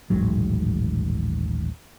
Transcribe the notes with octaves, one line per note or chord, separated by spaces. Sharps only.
D#1 A1 G#2 F#3